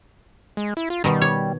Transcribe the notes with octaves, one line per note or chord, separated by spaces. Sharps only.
G#3
E4
F4
B2 D#3 G3
C#5